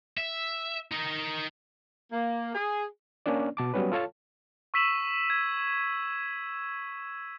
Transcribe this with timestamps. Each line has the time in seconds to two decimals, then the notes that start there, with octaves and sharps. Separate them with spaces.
0.17 E5
0.91 D#4 A#4
2.12 A#3
2.55 G#4
3.26 A#3 C#4 D4 D5
3.57 B2 A5 D6
3.74 F#3 G3 B3 C#4 B4
3.92 F4 A4 C#5 F5 A5
4.74 C#6 E6 B6 D#7 E7 F#7
5.30 G#6